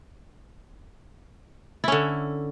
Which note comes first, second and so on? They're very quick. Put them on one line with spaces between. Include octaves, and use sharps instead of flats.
E4 C#4 D3